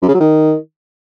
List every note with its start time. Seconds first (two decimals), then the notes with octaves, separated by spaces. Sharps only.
0.02 F#2
0.08 C#3
0.14 F#3
0.20 D#3